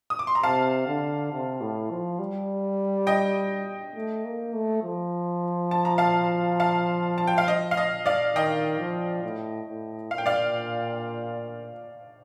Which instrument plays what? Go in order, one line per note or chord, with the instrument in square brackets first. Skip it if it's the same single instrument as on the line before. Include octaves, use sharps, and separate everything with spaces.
[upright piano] D#6
D6
C6
A#5
[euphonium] C3 [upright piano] F5 A5
[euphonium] D3
C3
A2
F3
G3
[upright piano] D#5 G5
[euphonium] A3
A#3
A3
F3
[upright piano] A5
A#5
F5 A5
F5 A5
A5
G5
F5
D#5
F5
D#5
D5 F5
[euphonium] D#3 [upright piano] D#5 G5
[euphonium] F3
A2
A2
[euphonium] A#2 [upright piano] F5
[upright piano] G5
D5 F5